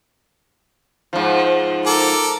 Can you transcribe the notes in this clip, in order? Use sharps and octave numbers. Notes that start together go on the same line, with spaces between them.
G#2 F3
A4 A#4 D6